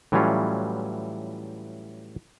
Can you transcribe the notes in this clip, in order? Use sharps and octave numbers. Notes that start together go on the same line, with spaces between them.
A2 E3 F#3 G3 C#4 F4